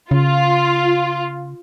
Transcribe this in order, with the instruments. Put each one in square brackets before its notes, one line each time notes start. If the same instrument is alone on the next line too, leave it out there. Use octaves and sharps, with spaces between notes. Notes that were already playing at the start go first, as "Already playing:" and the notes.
[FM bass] C#3 [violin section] F4